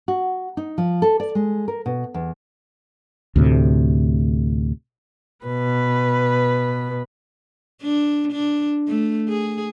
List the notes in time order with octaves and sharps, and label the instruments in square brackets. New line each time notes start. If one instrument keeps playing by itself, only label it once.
[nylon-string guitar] F#4
D#4
F3
A4
D5
G#3
A#4
B2
E2
[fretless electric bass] D2 A2 C3
[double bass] B2 [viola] B4
[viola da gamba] D4
D4
A3
G#4